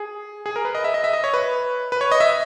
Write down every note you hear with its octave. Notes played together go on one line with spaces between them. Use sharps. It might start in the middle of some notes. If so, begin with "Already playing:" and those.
Already playing: G#4
G#4
A#4
B4
D#5
E5
D#5
E5
D#5
C#5
B4
B4
C#5
D#5
E5